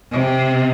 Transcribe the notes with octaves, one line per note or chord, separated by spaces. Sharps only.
C3